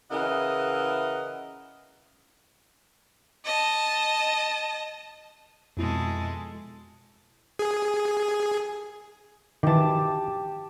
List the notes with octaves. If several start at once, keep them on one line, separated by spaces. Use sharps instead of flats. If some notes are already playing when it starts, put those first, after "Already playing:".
C#3 E3 E4 A#4 D#5 F#5
D#5 A5
F2 B2 G#3 E4 A4
G#4
D#3 E3 G4 A5